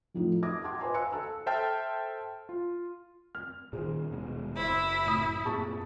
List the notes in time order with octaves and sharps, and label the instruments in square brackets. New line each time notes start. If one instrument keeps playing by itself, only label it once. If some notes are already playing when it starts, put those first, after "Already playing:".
[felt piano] F2 A2 F3 D#4
D6 D#6 G#6 A#6
F#5 G5 A5 C6 D6 G#6
B4 C5 D#5 G#5 A#5 C6
F5 G#5 A#5 E6 F#6 C#7
A4 A5 E6
[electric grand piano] A4 C5 E5 G5 A5 F6
F4
[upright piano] F6
[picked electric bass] A#2 D#3 [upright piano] G#4 C5
[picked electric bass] D#1 B2 G#3
[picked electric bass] F#1 [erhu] E4 [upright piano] C5 E5
[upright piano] A2 D#6 B6
[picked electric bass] F#2 A#2 A#3 [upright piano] G#4 A5 C#6